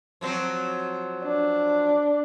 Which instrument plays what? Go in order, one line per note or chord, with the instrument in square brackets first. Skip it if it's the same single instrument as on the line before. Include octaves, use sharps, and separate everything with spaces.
[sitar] F3 F#3 C4
[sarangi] D4